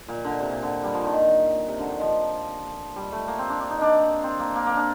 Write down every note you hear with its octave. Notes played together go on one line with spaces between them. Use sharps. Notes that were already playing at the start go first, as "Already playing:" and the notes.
A#2
D3
C3
A#2
D3
G3
F3
D#3
C3
D3
D#3
F3
G3
A3
A#3
C4
D4
D4
D#4
D4
C4
A#3
A#3
A#3
D4